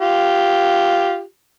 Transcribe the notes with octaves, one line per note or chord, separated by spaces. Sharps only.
F4 G4